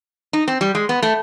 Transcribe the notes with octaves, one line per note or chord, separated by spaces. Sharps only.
D#4
C4
G3
G#3
B3
A3